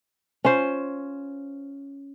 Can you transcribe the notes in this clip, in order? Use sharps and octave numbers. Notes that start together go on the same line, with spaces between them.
C#4 F4 C5